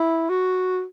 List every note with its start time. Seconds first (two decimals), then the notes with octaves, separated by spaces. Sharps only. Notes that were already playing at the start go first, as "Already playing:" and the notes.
Already playing: E4
0.29 F#4